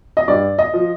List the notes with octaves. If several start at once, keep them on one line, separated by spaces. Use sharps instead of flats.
D#5
G2 D5
D#5
F3